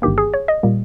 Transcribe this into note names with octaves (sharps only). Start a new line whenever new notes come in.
G1 G2 D#3 A#3 G4
G#4
C#5
D#5
A#2 G3 A#3